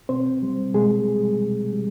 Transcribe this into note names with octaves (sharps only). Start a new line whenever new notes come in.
B2 C4 C5
G3
B2 G#3 G#4
G3
B2
G3